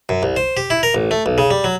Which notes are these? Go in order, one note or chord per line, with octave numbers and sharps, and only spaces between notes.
F#2
C2
C5
G4
E4
A#4
A1
A3
B1
C#3
G3
F#3